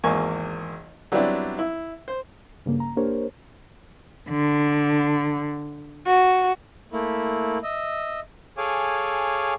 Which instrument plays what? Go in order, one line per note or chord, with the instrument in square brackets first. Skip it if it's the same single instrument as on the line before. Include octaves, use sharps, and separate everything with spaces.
[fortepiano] G#1 E2 A#3 G#5 C#6
F#3 G3 B3 C4 D4 E4
E4
C5
[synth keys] G2 C#3 A#3
A#5
A#3 D4 G4 A#4 C5 C#5
[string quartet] D3
F#4
[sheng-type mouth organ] A3 A#3 E4
D#5 E5
G#4 A4 C#5 F5 G#5 D6